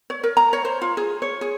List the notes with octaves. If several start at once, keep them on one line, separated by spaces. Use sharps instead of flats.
C#5
A#4
A#5
C#5
C5
F4
G#4
C#5
G#4